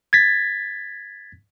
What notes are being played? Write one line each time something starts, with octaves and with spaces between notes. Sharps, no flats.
G#6 A6 B6